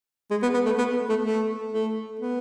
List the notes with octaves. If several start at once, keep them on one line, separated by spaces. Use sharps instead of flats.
G#3
B3
B3
A3
B3
A3
A3
A3
B3